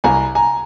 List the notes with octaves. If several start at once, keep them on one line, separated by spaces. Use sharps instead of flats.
C2 G#5 A#5
G#5 A#5